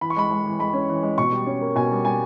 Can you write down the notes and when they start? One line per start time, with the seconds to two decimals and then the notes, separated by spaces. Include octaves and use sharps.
0.01 E3 B5
0.10 C#6
0.17 G#3 B5
0.31 G#3
0.46 E3
0.59 G#3 B5
0.74 C#4
0.89 E3
1.03 G#3
1.18 B2 C#6
1.32 G3
1.46 C#4
1.61 A#3
1.76 B2 G#5
1.91 G3
2.05 G3 G#5